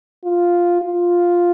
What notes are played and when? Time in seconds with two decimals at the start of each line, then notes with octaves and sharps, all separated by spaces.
0.24 F4
0.82 F4